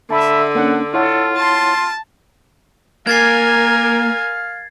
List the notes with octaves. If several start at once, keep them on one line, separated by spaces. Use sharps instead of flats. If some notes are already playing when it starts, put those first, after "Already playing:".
D3 E5 A5 B5
A#3 C#4 D4 F#5
E4 F4 A4 C#5 F#5
A5 C6
A#3 A#4 F5 G#5 G#6 A6 C7